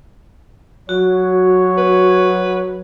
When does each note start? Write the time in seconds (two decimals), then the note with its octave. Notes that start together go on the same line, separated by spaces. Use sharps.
0.89 F#3 F#4 C#5
1.78 B4